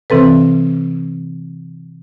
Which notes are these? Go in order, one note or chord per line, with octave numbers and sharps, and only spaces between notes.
C3 E3 C4 A4 B4